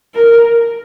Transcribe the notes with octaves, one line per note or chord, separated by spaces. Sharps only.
A#4